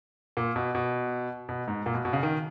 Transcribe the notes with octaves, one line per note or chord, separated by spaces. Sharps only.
A#2
B2
B2
B2
G#2
A#2
B2
B2
C#3
D#3